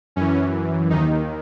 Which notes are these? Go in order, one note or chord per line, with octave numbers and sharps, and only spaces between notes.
F#2 E3 C#4
D#2 D#3 D#4